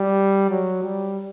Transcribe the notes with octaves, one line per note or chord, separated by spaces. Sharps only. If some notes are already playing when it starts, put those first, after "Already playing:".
Already playing: G3
F#3
G3